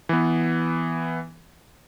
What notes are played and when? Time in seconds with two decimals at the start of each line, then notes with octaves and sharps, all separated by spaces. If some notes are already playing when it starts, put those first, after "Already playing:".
0.09 E3 B3